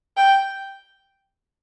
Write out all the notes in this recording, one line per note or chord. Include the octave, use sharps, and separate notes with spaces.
G5